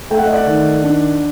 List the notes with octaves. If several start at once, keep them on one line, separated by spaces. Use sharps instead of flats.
A3 G5
F#5
D#5
D5 F#5
D#3
D4